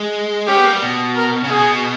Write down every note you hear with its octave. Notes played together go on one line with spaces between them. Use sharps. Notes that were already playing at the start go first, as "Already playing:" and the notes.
Already playing: G#3
C#4 G4
B3
A#3
G3
B2
A#4
C#3
B2 G#4